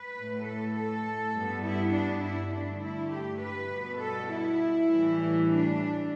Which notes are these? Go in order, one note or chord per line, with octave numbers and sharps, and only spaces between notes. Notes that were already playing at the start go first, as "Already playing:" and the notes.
Already playing: B4
A2 A3
A4
A4
G2 G3 B3
E4
D4
E4
G2 D3 A3 D4
E4
G4
B4
B2 G3 B3
A4
E4
A2 E3 G3
D4